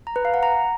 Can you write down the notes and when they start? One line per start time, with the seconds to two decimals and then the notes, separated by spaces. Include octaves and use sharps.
0.07 A#5
0.16 B4
0.25 F5
0.34 F#5
0.43 A#5